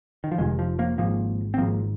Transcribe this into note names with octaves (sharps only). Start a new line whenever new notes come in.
D#3
F3
F1 F2 C3 D#3 G#3
F3
F3 A#3
G#1 G#2 F3 A#3
C4
G#1 G#2 F3 A#3